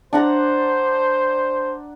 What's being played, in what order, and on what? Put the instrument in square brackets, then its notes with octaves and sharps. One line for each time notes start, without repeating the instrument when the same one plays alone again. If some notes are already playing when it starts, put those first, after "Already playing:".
[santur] D4 F#5 A#5 [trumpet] C5